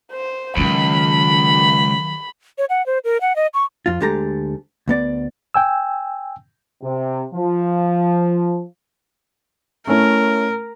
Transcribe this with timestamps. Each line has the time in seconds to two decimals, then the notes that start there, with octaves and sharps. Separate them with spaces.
0.12 C5
0.57 C#2 D#3 F#3 B5
2.58 C#5
2.69 F#5
2.86 C5
3.04 A#4
3.21 F#5
3.36 D#5
3.54 C#6
3.86 F2 F4
4.00 D2 D3 G#3 G4 A4 A#5
4.88 D2 B3 D5
5.54 G5 G#5 E6
6.83 C3
7.34 F3
9.87 A3 C#4 E4 A#4